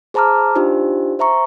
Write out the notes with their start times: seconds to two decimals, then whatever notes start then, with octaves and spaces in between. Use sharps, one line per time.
0.14 G#4 C5 A5 A#5 D6 F6
0.55 D4 D#4 F4 G4 C5
1.19 C5 E5 A#5 C#6